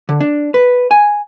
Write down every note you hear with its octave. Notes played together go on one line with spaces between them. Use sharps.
D3
D4
B4
G#5